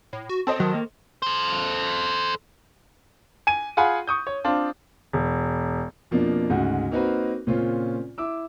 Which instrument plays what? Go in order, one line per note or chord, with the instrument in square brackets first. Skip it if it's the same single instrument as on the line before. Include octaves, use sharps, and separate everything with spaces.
[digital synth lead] A2
F#4
[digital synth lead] C4 [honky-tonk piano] A4 C5 D#5
[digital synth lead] D#3 [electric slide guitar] F#3
[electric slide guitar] A#3
[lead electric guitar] A4 C5
[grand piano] G#5 D#7
F4 G#4 F#5 G#5 B5
C#6 D#6 G6
C#5
C4 D4 F4
[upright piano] E1
[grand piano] F2 B2 F3 A#3 D4 F4
D2 G#2 C#3 F#4 F#5
A#3 C4 D#4 F#4 A#4 B4
A#2 C#3 C4 C#4 F4
E4 D6 E6